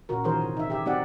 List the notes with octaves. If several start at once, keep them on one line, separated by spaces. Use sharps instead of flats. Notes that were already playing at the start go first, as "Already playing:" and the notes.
A#2 C#3 F#4 A#4
D#3 E3 F#3 G#4 A#4 C5
C3
D#4 E5
G4 G#4 E5
F#3 C4 D#4 G4 D5 F#5